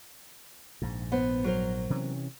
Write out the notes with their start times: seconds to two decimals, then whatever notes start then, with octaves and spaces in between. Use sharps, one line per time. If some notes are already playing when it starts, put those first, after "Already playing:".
0.82 A#1 G#2
1.12 B3 B4 C5
1.44 F#3 A#4 C5
1.90 C3 E3 C#4